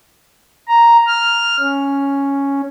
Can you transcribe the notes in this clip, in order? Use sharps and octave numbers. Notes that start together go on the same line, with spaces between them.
A#5
F6
C#4